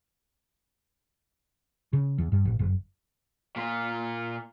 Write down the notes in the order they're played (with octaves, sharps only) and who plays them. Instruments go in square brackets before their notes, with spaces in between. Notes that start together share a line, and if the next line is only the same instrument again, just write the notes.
[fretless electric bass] C#3
E2
G2
A1
F#1
[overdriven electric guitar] A#2 F4